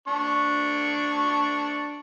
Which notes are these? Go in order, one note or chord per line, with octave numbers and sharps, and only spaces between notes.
D4 C#6